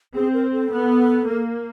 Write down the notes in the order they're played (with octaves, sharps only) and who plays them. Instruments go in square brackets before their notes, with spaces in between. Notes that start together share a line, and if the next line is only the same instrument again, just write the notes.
[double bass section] C4 [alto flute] G#4
[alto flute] A#4
A4
[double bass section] B3
A#3